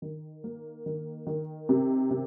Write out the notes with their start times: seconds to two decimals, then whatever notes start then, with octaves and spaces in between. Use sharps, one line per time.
0.02 D#3
0.44 A#3
0.86 D#3
1.27 D#3
1.69 C3
2.10 C3